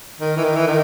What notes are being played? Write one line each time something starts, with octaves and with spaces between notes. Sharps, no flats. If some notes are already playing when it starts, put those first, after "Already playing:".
D#3
E3
D#3
E3
D#3